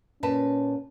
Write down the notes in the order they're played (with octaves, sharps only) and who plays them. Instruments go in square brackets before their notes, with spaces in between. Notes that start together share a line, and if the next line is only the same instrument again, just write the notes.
[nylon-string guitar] A#2 B4 A5 [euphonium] C#4